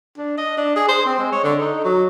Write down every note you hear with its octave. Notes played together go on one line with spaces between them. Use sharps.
D4
D#5
D4
G#4
C5
C4
G#3
C#5
D3
D#4
F#3